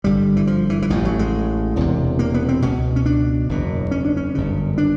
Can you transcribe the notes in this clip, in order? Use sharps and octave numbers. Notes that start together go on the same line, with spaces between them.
G#1 G2 D3 G3
E3
F3
E3
E3
A1 A2 F3
F#3
G#3
E1 E2 C3
A#3
B3
C4
C#2 B2 C#4
C#4
D4
F#1 E2 B2
C#4
D4
C#4
G1 F#2 C#3
D4